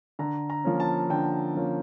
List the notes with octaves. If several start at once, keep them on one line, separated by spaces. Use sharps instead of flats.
D3 A#5
A#5
F3 A#3 C#4
A5
D3 G5
F3 A#3 C#4